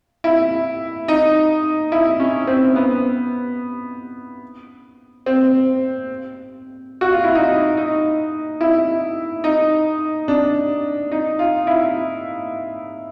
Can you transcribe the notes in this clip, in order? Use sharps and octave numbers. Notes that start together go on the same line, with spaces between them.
E4
D#4
E4
C#4
C4
B3
C4
F#4
F4
E4
D#4
D#4
E4
D#4
D4
D#4
F4
E4